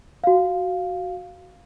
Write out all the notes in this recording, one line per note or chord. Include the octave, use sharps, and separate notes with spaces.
F#4 F5